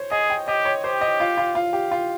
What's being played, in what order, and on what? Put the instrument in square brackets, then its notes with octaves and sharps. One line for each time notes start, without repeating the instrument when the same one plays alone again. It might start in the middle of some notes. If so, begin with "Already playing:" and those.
Already playing: [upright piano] C5 C#5
[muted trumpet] G#4 [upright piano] D#5
[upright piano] G5
[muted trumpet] G4 [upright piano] D#5
[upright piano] C#5
[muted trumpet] G4 [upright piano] C5
[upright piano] D#5
F4
F4
F4
G4
F4